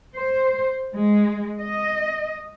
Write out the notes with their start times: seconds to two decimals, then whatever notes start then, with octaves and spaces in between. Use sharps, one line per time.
0.16 C5
0.95 G#3
1.61 D#5